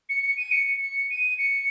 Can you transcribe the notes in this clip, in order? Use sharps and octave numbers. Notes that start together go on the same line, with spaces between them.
C#7
C#7
D#7
C#7
C#7
D#7
C#7